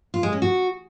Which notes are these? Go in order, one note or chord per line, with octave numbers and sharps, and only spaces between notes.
F4
G#3
C#4
F#4